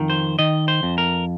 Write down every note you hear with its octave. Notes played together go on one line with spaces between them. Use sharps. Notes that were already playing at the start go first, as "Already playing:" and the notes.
Already playing: F2 D#3
C5
D#3 D#5
C5
F2
A#4